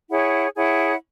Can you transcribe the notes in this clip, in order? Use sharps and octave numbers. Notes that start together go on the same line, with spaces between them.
E4 G#4 C#5 F#5
E4 G#4 C#5 F#5